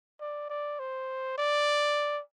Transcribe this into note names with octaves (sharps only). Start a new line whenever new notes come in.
D5
D5
C5
D5